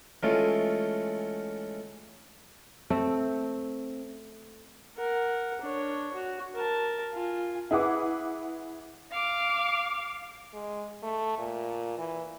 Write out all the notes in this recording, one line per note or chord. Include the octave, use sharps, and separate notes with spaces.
E3 G#3 A3 C#4 F4
A3 C4
A#4 F#5
D4 C#5
F#4
A#4 A5
F4 G#5
E4 G#4 B4 F#5 D6
F5 D6
G#3
A3
A#2
E3